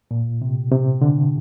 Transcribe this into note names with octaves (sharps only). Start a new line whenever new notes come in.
A#2
C3
C3
D3